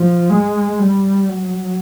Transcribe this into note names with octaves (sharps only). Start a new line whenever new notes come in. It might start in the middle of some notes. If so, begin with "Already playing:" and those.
Already playing: F3
G#3
G3
F#3